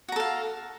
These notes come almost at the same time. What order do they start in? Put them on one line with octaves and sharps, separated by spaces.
F#4 A#5 A4 F5